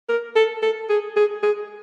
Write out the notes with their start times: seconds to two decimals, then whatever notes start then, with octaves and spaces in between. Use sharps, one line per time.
0.09 A#4
0.36 A4
0.62 A4
0.89 G#4
1.16 G#4
1.43 G#4